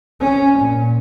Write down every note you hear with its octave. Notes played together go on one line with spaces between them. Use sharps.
C#4
A#2